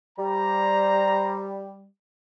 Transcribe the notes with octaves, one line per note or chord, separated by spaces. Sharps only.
G3 C5 A#5